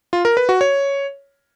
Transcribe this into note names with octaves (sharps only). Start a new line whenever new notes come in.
F4
A#4
B4
F#4
C#5